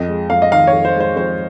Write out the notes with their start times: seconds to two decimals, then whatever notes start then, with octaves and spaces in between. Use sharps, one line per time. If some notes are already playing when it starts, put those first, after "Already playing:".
Already playing: F2 D#5
0.09 G#3
0.30 F2 F5
0.42 D#5
0.52 D#3 F5
0.67 C#5
0.73 F2
0.85 C5
0.95 G#3
1.00 C5
1.16 F2 C5